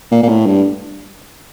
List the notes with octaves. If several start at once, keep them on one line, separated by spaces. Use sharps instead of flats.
A#2
A#2
A2
G2